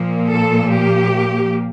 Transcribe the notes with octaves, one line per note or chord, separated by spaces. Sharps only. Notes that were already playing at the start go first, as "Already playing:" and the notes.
Already playing: A#2 F3 A#3
A4
G4